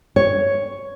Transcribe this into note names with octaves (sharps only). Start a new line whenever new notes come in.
C#5